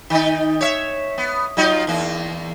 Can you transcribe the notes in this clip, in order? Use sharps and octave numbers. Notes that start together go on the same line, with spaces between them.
D#3 D#4
C#5 E5
B3
F#3 D#4 F4
E2 A#3